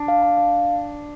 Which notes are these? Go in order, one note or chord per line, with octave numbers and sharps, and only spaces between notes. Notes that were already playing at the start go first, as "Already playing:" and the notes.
Already playing: D4
F5
A5
F5